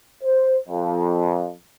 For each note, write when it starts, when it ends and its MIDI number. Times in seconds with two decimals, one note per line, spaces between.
0.24 0.57 72
0.68 1.52 41